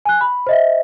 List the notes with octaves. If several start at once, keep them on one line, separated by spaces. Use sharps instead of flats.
G#5 F#6
B5
C5 D#5 E5